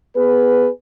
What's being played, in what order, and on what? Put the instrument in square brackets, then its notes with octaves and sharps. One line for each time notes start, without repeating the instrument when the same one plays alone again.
[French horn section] B3 G#4 B4